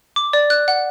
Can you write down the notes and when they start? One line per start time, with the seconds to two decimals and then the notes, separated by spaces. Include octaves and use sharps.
0.16 D6
0.33 D5
0.50 F#6
0.68 F#5